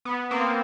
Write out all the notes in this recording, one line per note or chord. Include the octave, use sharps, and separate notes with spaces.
B3
A#3 C4